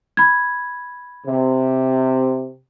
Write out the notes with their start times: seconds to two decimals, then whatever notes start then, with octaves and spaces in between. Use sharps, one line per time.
0.17 B5 G#6
1.26 C3